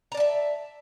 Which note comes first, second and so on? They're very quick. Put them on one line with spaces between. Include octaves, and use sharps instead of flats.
A#5 D5 A5 E5